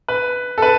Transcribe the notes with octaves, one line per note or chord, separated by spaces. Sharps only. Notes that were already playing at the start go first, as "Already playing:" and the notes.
B4
A4
B4